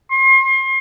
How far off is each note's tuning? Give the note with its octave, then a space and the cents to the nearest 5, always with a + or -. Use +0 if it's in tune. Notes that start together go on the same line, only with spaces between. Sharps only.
C6 +35